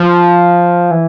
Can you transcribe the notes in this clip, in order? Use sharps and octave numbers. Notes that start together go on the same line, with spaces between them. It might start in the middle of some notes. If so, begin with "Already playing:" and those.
Already playing: F3
E3